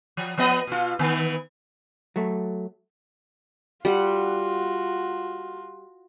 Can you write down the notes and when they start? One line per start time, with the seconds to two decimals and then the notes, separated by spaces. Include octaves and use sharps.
0.17 F3
0.38 F3 B3 D#5
0.67 B2 F4
0.99 D#3 E3 B3
2.16 F#3 A3
3.85 G3 F4 F#4 F#5